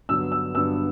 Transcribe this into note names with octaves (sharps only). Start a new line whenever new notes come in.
G2 D3 F#3 B3 E6
E6
G2 D3 F#3 B3 E6